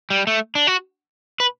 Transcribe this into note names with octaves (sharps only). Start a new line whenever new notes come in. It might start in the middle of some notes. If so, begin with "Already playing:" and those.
G3
A3
D4
F#4
B4